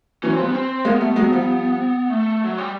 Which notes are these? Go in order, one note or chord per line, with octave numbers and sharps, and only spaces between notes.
E3 F#3 C#4
C4
F3 G3 B3
C4
G#3 A#3 B3
G3 A3
F#3 G#3
F3 G3
A3
F#3
G3